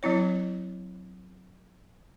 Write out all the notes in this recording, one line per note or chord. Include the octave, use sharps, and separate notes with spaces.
F#3 C4 E4 C#5